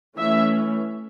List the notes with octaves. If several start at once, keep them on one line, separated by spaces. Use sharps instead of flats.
E3 A3 C#4 E5